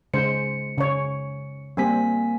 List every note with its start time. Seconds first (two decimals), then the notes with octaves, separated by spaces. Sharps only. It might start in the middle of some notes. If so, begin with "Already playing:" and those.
0.14 C#3 G#3 C5 C#7
0.78 C#3 C#5
1.77 G3 A#3 C4 G#5 B6